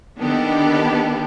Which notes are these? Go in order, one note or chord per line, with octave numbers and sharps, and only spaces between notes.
D3 D#3 B3 D4 G4 A4